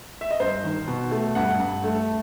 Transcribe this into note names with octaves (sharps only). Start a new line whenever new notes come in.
E5
D#5
G2 C5
D#3
B2
A3
G2 F#5
G2
A3